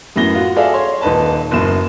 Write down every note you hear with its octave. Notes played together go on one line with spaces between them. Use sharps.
F#2 A2 B3 A#6 G7
F4 F#4
F#4 G#4 A4 D5 E5 F5
C#5 C6
D#1 D#4 B4 A5
F#1 F#2 B3 E7